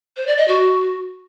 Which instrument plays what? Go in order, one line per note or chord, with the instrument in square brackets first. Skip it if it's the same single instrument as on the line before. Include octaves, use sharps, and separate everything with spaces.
[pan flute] C5
D5
D#5
F#4